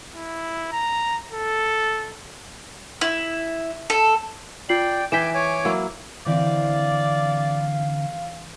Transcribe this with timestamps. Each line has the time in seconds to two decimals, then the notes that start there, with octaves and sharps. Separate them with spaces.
0.15 E4
0.72 A#5
1.32 A4
3.01 E4
3.90 A4
4.69 F4 D5 G5 C7 F#7
5.12 E3 G5 G#5 D6 B6 E7
5.34 C#5 G#5 D6
5.65 F#3 A#3 E4
6.26 D3 E3 C4 D5 F5